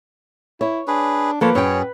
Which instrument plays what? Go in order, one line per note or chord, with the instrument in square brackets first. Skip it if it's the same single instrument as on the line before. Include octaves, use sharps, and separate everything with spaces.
[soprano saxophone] E4 [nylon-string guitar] C#5
[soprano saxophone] D4 [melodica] G#4 B4
[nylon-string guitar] F3 A#3 [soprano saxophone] A4 [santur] B4 [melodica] C#5
[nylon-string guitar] F#2 G5 [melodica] C#4 G#4 [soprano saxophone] C#5